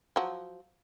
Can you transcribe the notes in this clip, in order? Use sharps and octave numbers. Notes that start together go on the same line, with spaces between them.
F3 F#3